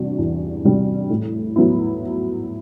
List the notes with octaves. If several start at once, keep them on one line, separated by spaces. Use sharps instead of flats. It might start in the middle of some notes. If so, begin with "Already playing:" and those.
Already playing: E2 C3 G3 D4 F#4
E2
C3 G3 D4 F#4
A2
F#3 B3 E4